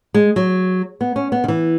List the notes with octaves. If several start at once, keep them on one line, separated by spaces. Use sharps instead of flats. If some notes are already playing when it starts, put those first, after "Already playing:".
G#3
F#3
B3
C#4
B3
D#3
E3